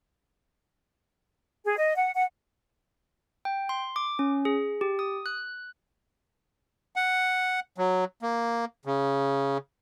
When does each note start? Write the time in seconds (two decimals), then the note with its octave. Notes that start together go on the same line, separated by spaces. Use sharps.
1.65 G#4
1.78 D#5
1.96 F#5
2.15 F#5
3.45 G5
3.69 C6
3.96 D6
4.19 C#4
4.45 G#4
4.81 G4
4.99 D#6
5.26 F#6
6.96 F#5
7.78 F#3
8.22 A#3
8.85 C#3